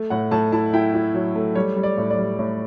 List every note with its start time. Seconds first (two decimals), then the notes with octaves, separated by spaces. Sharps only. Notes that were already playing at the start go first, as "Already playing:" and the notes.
Already playing: A3
0.10 A2 F#5
0.31 A2 A5
0.52 E4 A5
0.74 E4 G5
0.94 E4
1.14 F#3
1.36 A3
1.55 G3 C#5
1.76 G3
1.83 D5
1.97 A2
2.10 D5
2.18 G3
2.39 A2